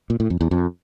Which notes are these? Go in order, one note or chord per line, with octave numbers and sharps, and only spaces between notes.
A#2
A2
F2
E2
F2